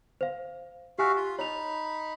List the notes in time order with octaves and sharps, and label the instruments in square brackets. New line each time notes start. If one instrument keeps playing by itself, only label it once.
[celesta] C5 F5
[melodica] F#4 E5 F5 [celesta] G4 G#5 F#6
[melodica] F4
[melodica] D#4 B5 [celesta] C#5 F7